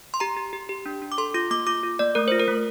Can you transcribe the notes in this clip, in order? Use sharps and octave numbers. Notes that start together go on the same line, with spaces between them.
C6
G4 A#5
G4
G4
G4
D4
D4
D6
A4 C6
F4 D6
A#3 D6
F4 D6
F4
A#3 D5
A3 A#4
C5
F4
A#4
A3